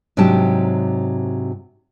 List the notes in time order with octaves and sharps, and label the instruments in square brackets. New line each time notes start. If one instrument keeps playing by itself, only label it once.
[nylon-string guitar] G#2 C3 F#3 D4 G4 A5